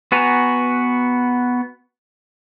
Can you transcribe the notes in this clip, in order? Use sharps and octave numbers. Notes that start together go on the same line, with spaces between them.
B3 F#4 B4 G#5 A#5